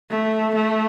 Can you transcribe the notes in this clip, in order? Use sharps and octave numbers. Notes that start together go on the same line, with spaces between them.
A3
A3